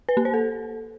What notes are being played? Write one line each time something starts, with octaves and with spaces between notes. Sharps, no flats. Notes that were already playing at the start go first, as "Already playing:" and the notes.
B4
A#3
C5
A4